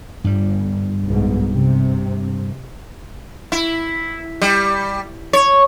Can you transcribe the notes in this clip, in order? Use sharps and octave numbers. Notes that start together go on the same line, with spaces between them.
G1 G2 G3
B1 G#2 B2
C3
E4
G3
C#5